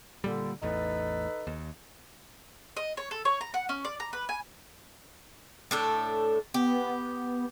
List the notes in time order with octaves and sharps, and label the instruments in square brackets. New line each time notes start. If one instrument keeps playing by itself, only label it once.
[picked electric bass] A#2 G3 [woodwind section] D3
[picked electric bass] A1 E2 A2 [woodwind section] D#4 A4 B4
[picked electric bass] D#2
[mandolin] D#5
C#5
A4
C#5
A#5
F#5
C#4
D5
A#5
B4
G#5
[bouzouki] A2 D4 A4
[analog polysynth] B3 [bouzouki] G4